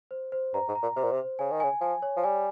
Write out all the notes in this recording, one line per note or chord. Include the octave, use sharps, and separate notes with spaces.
C5
C5
G2 A#5
G#2
A#5
A#2
C3 C5
A#2
C3
C5
C#3 G#5
D#3
C#3 G#5
F3 G#5
C#5
F3
G3 G#5